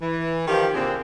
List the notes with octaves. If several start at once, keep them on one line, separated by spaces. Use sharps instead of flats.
E3
D#3 F3 G4
A#2 D3 C4 G#4